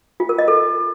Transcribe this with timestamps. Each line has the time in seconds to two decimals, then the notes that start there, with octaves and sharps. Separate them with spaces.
0.20 F4
0.29 A#4
0.38 D#5
0.48 A4